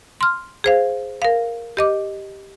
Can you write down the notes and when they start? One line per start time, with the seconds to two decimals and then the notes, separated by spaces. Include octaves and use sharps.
0.21 C6 F6
0.64 G#4 C5 F5
1.22 A#4 F5
1.77 G4 D#5 D6